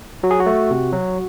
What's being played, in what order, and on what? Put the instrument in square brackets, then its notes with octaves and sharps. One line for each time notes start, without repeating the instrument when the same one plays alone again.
[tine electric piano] F#3 F#4
G#4
F#4
A3
C3
F#3